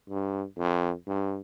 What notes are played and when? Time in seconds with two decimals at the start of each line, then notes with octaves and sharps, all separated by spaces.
0.09 G2
0.58 F2
1.07 G2